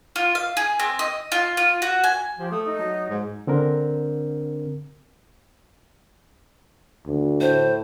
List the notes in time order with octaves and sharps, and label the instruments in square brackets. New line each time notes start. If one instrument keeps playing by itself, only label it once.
[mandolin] F4
F5
G#4
C4
D#5
F4
F4
F#4
G#5
[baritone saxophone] F3 [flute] G4
[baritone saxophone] A3 [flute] D#6
[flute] D#4
[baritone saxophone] F#3
G#2
[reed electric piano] D3 C4 D4 A#4
[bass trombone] D2
[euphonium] A2 [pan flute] C5